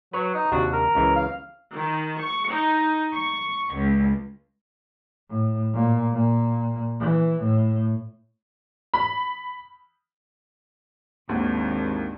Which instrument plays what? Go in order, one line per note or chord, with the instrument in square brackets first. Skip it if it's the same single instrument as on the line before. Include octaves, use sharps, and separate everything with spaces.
[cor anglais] F#3 [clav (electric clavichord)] B4 C#5
[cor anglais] D#4
[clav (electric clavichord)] D#2 C3 D4 [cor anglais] F#4
[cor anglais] A#4
[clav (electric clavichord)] C#2 C#3 E3
[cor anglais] F5
[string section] D#3
C#6
D#4
C#6
C#2
[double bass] A2
A#2
A#2
E3
A2
[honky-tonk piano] B5
[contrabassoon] G#1 [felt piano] D#2 F#5 [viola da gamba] D#3 D4